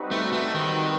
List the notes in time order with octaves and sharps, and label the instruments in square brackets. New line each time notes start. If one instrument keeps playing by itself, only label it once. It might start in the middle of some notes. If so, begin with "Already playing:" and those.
Already playing: [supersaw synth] G3 C4 D#4 F#4 B4
[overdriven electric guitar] A3
A3
D#3